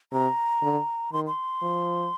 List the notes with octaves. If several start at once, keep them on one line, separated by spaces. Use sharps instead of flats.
C3 A#5
D3
D#3 C6
C6
F3